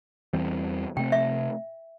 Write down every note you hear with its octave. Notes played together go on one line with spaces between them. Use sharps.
E2 E3 G3 C4
C3 A3 C4 G5
E5